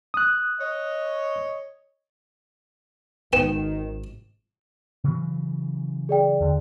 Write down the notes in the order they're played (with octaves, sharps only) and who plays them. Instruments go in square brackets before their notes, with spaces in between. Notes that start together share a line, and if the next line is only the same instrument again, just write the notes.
[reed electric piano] D#6 F#6
[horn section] C#5 D#5
[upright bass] G#1 C#4 [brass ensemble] D#3 [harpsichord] B3 G5 [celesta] E7
[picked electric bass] C#3 E3 F#3
[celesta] G#4 D5 G5
[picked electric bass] D#2 D3